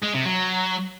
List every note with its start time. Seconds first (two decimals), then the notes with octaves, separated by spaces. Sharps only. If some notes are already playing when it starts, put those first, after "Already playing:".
0.03 G#3
0.14 C3
0.25 F#3